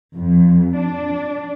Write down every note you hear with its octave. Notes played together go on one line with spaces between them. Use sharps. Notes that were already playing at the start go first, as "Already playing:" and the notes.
F2
D4